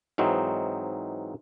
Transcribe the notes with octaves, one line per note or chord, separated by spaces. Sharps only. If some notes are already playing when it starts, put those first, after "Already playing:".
G#2 E3 F#3 C4 D#4